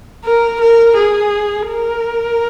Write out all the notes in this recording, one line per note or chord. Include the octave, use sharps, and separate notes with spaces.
A#4
A#4
G#4
A#4